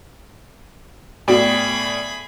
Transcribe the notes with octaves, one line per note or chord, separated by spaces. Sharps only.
A2 B3 F#4 G#4 D5 G5 B5